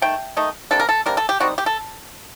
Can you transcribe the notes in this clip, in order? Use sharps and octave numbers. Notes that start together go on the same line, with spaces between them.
D#3 A3 G5
D#3 A3 D#4
C3 G3 A#3 D4 A4
A#4
A4
C3 G3 A#3 D4 A#4
A4
G4
D#3 G3 C4 D#4 F#4
G4
A4